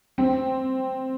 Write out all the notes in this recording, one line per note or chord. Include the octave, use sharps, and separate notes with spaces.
C4